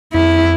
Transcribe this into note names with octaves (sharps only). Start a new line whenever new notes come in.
F2 E4